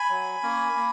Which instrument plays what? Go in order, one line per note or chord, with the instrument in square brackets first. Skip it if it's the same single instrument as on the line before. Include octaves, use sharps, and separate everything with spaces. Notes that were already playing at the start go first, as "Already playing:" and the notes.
Already playing: [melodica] G#5 B5
F#3
A#3 C#4
A#3